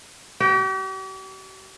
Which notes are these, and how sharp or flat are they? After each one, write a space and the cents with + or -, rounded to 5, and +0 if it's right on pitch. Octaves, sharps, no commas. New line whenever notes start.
G4 -45 G5 +0